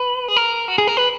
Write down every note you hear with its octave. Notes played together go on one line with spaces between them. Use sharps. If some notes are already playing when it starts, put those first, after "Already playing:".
Already playing: B4
G#4
A#4
F#4
G#4
A#4
B4